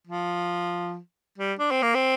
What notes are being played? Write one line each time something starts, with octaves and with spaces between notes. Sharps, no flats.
F3
G3
D4
C4
A#3
C4